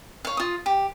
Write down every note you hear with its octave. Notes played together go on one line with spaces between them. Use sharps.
C#5 F5
F4 D#6
G4